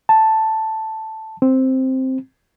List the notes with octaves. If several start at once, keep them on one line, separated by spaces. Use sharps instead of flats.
A5
C4